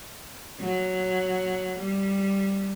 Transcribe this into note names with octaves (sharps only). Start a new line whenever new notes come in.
F#3
G3